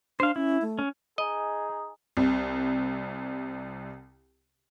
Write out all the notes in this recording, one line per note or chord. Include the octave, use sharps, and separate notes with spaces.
D4 C5 F5
C#4 E4
A3
C#4
D#4 G#4 D#5
C2 C3